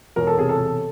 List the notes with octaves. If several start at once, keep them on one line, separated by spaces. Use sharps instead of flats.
E1 A#4
A4
C3 G#4
A4
E1